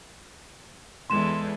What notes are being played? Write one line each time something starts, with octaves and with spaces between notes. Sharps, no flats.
E2 G#3 A4 C6 E7